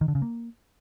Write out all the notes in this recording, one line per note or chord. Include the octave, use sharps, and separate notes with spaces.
D#3
D3
C#3
A#3